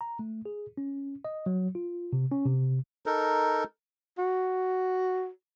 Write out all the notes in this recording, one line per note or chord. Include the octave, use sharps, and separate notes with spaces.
A#5
A3
G#4
C#4
D#5
F#3
F4
C3
C#4
C3
D#4 A4 A#4
F#4